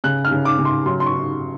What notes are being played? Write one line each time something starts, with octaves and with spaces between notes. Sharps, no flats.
C#3 F#6
F6
C#3
D6
C#3
C6
F#3 C6
C6
C#6